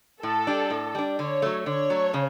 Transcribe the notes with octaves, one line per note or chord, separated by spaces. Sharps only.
A2 A4
G3 D4
A2
G3 D4
D3 C#5
F#3 A3
D3 C#5
F#3 A3
C#3